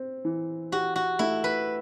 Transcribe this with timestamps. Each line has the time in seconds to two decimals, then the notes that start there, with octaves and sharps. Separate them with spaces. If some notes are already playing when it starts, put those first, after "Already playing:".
Already playing: C4
0.25 E3
0.72 F#4 G4
0.96 F#4
1.19 A3 E4
1.44 B4